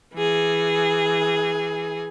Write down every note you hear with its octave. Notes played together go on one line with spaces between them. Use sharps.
E3 G#4